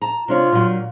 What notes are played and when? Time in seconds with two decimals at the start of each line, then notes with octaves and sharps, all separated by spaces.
0.02 A5 A#5
0.28 C3 D4 F4 C#5
0.52 A#2 F#3